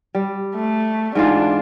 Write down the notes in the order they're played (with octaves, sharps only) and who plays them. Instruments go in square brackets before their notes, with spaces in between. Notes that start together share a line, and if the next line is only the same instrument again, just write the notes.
[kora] G3
[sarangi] A3
[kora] G#2 E3 F4 [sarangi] D4